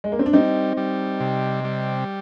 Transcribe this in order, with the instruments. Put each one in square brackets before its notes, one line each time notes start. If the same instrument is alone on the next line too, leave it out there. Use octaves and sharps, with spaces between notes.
[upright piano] G#3
A#3
C4
D4
[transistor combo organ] G3 [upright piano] C4 D#4
[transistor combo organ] G3
C3
G3